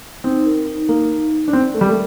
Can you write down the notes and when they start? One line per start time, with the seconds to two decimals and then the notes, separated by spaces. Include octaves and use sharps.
0.24 C4 D#4
0.46 A#4
0.68 D#4
0.89 A#3 D#4
1.11 D#4
1.31 D#4
1.48 D4
1.53 C4 D5
1.74 A3 A#4
1.81 G3
1.88 A3